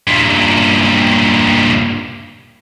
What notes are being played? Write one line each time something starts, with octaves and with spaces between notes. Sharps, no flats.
G2 A#2